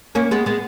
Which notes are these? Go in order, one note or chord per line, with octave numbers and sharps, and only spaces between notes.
A#3 C#4
G#3 B3
G#3 B3